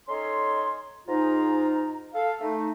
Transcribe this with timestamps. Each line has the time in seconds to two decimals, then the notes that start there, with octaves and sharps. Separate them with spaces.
0.08 C#4 D#4 A4 C#5 C6
1.07 G#2 D#4 F4 A#5
2.14 A4 F5
2.41 A3 D#4